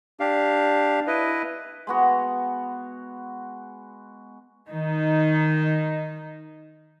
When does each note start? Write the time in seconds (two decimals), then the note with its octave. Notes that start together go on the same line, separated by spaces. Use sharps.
0.20 D4 G4 F5
1.07 E4 B4 D#5
1.87 G#3 B3 F#4
4.71 D#3 D#4